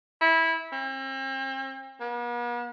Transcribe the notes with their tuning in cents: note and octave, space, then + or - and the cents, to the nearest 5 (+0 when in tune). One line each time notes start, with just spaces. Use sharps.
E4 -15
C4 +40
B3 -45